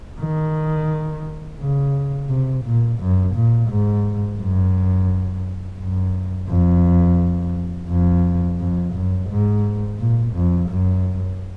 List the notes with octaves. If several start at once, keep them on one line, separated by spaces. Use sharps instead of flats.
D#3
C#3
C3
A#2
F#2
A#2
G#2
F#2
F#2
F2
F2
F2
F#2
G#2
A#2
F2
F#2